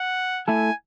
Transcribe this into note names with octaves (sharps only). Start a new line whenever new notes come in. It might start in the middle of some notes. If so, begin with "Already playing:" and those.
Already playing: F#5
A3 E4 A4 G#5